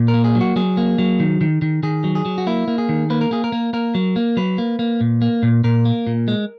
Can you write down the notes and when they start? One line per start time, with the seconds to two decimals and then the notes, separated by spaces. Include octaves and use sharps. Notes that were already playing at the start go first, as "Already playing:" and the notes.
Already playing: A#2
0.08 A#4
0.14 A#3
0.24 G#4
0.35 F#3
0.40 F#4
0.56 F#3 G#4
0.77 A#3
0.98 F#3
1.20 D#3
1.41 D#3
1.62 D#3
1.83 D#3 G#4
2.04 F#3
2.15 G#4
2.25 F#3
2.38 F#4
2.47 A#3 E4
2.68 A#3
2.78 G#4
2.89 D#3
3.10 A#3 B4
3.21 A#4
3.31 A#3 G#4
3.44 A#4
3.52 A#3
3.73 A#3 A#4
3.95 F#3
4.16 A#3
4.37 F#3 B4
4.58 A#3
4.79 A#3
5.01 A#2
5.22 A#3
5.43 A#2
5.64 A#2 A#4
5.85 A#3
6.07 A#2
6.28 G#3